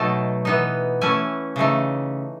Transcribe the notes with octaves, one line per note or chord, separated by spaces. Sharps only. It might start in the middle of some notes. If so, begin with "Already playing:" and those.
Already playing: B2 F#3 A3 D#4 A5
E3 B3 D#4
E3 A3 C#4 E4 G#5
C#3 E3 A3 D#4